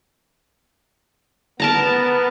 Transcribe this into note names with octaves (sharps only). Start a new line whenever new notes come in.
B3 A#4 A5 A#5